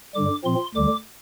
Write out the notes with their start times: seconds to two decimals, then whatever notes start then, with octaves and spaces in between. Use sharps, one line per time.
0.14 G2 D3 G3 D6
0.44 A#2 F3 C4 C6
0.75 D2 D3 G3 D6